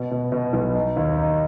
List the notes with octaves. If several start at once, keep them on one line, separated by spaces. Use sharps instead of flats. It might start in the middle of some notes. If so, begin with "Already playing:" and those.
Already playing: B2
B2
B2
B1
D#4
D#2
D#4